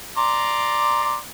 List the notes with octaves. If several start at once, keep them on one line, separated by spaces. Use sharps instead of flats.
D5 A#5 C6